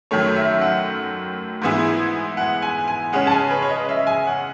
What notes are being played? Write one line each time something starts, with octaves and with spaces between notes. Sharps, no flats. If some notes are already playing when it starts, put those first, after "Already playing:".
F#2 D#3 A3 C#5
E5
F#5
G#2 E3 B3 E4 G#4
F#5
G#5
G#5
C#3 G#3 C#4 F#5
A5
G#5
B4
C#5
D#5
E5
G#5
F#5